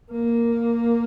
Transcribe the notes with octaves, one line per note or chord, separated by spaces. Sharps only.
A#3